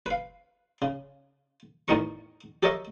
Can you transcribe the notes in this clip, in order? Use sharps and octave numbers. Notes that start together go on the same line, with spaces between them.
B4 F5
C#3
E2 A2 A3 D#4 A#4 C#6
G4 A4 A#4 C#5 D#5 E5